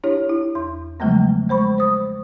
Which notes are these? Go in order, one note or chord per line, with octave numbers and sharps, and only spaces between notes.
D4 E4 G4 C#5
E4
E2 C6
C#3 F3 F#3 G#3 A3 B3
G#3 C5 B5 C#6
C5 D#6